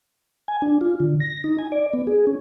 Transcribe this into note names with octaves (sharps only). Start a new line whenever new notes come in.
G#5
D4
F4
D3
A#6
D#4
G#5
D5
B3
G#4
C#4